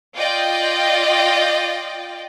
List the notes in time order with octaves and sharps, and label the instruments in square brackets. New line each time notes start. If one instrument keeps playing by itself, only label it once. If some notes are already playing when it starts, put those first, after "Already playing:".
[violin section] F4 D5 D#5 G5